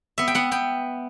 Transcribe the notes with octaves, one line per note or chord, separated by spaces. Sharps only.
B3 E5
G5
B3 F#5
B3 G5